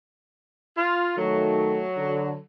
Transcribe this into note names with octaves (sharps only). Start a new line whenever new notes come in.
F4
D#3 F#3 A3 A4
D3